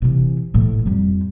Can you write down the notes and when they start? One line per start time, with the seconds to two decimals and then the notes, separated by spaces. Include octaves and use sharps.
0.02 C3 E3
0.54 A2 E3
0.86 F2 G3